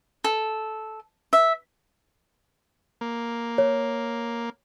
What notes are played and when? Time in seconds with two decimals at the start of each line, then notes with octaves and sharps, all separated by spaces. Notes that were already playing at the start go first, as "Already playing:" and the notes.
0.24 A4
1.33 E5
3.01 A#3
3.58 C#5